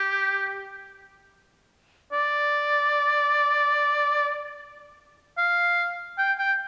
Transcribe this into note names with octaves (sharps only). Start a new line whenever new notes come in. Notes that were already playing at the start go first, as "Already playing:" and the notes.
Already playing: G4
D5
F5
G5
G5